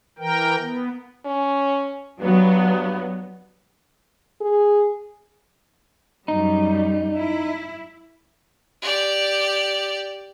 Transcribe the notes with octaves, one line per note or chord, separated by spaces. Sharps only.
E3 A#4 G5
B3
C#4
G2 F#3 B3
G#4
F#2 G3 D#4
E4
G4 D5